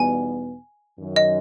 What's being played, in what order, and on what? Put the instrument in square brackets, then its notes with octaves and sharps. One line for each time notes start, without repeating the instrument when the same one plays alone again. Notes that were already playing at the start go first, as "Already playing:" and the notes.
Already playing: [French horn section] E2 B2 G3 B3 D#4 [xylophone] G#5
[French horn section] F#2 D#3 F#3
[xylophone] D#5